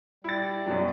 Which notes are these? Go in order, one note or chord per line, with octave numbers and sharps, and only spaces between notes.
G3 E4 A6
F#2 B2 F#3